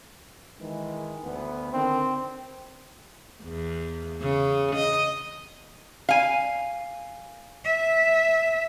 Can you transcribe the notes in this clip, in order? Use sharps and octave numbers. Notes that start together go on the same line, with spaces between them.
D#3 E3 G#3
D2 B3
D3 D#3 C4
E2
C#3
D#5
F5 G#5
E5